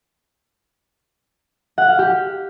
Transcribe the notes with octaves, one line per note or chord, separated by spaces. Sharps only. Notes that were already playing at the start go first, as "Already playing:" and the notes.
F#5
F5
G4